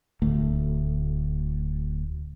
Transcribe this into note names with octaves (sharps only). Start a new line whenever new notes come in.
D1 D2 A3